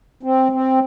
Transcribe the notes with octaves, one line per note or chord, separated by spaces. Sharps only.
C4
C4